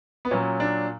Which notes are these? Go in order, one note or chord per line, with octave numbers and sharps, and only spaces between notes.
B3
A#2 F#3 C#4
D4